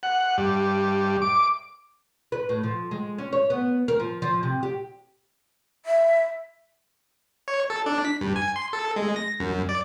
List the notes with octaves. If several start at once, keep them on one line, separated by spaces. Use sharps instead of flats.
F#5
G2
D6
B4
A2
F3
G#3
C#4
C#5
B3
A#4
F3
F3
C3
G4
E5
C#5
A4
D4
B6
G2
G#5
C6
A4
G#3
A#6
F#2
D5